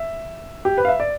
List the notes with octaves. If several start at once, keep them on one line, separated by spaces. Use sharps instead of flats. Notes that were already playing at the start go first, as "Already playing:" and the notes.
Already playing: E5
G4
B4
F5
E5
D5